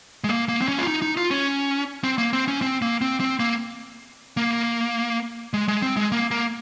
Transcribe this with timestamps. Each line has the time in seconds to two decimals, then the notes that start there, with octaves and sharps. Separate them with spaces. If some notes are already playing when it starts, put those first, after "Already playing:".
0.24 G#3
0.29 A#3
0.49 A#3
0.62 C4
0.68 C#4
0.78 F4
0.87 D#4
1.02 D#4
1.17 F4
1.31 C#4
2.04 C4
2.18 A#3
2.33 C4
2.48 C#4
2.62 C4
2.82 A#3
3.01 C4
3.20 C4
3.40 A#3
4.37 A#3
5.54 G#3
5.68 G#3
5.82 C4
5.97 G#3
6.12 A#3
6.31 A#3